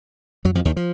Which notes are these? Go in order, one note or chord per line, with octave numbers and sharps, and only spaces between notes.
F#2 F#3
F2 F3
D#2 D#3
F3